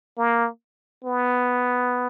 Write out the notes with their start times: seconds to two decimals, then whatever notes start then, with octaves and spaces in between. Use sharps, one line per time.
0.18 A#3
1.04 B3